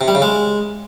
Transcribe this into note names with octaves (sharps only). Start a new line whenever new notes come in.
C3
G3
C#3
G#3